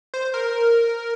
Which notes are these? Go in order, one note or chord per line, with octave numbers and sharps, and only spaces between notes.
C5
A#4